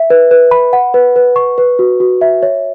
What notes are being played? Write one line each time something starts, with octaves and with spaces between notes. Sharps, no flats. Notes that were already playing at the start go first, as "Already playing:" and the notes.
Already playing: E5
B4
B4
B5
F#5
B4
B4
C#6
B4
F#4
F#4
E5
C#5